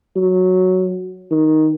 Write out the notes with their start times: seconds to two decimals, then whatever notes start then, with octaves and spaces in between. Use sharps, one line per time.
0.16 F#3
1.31 D#3